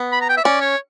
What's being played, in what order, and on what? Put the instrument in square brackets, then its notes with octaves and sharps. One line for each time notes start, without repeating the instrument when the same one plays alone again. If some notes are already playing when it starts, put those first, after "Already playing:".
Already playing: [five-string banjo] B3
[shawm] B5
A#5
G5
E5
[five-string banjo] C#4 [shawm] D5
[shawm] C#5